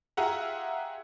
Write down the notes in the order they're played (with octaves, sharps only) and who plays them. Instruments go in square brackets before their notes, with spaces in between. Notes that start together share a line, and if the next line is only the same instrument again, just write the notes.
[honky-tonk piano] F4 G4 G#4 E5 F#5 A#5